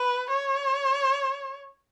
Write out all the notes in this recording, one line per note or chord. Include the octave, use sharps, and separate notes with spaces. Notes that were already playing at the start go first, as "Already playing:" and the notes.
Already playing: B4
C#5